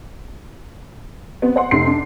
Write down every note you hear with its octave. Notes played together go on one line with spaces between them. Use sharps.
B3 C4
C5 F#5 C6
F1 D#3 C#4 C6 C7
D4